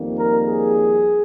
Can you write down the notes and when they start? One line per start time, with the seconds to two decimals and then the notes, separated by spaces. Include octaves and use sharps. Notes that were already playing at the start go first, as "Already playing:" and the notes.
Already playing: F2 D#3 G3 A#3
0.17 A#4
0.47 G#4